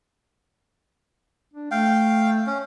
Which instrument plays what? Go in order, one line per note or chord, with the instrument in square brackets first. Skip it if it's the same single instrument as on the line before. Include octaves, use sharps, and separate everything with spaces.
[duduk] D4
[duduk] A3 [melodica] F5 G5
[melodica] C#4